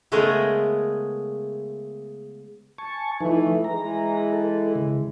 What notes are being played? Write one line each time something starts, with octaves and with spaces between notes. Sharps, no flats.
C#3 G#3 A3 B3 G#4 A#4
G#5 A5 C#6
E3 F3 A3 D#4
E3 G#3 A#5
A4
C#3